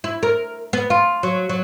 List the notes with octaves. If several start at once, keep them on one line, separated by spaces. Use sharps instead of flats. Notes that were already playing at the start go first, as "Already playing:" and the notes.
E4
A#4
B3
F4
F#3
F#3